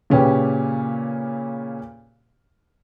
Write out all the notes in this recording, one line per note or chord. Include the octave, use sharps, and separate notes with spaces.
A#2 C#3 C#4 G4 B4